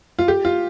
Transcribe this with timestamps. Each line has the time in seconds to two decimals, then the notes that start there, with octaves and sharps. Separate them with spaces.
0.19 F4
0.28 G4
0.45 F4